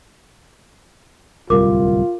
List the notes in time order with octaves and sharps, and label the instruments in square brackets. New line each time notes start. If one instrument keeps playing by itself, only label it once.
[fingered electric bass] D1 C2 G3 [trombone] F4 [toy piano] A#4 D6